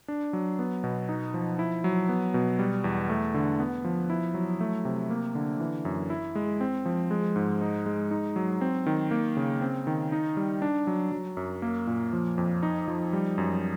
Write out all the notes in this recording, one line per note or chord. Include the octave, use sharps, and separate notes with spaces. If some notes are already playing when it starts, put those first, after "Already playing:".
D4
F#3
B3
B2
D#4
F3
E4
F#3
B3
B2
G3
E2
A3
D3
B3
F3
E4
F#3
A3
C3
A#3
D3
E3
F#2
E4
G#3
C4
F3
G#3
G#2
D#4
G#3
D#4
F#3
C4
D#3
A#3
C#3
C4
D#3
D#4
G3
D4
F#3
F#3
F#2
A#3
A#2
F3
F2
D#4
F3
G3
F#2